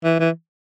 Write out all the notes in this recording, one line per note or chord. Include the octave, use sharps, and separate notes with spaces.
E3
E3